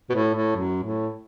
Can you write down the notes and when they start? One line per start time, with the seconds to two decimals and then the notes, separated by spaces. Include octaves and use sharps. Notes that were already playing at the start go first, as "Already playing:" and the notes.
0.09 B2
0.14 A2
0.35 A2
0.55 F#2
0.83 A2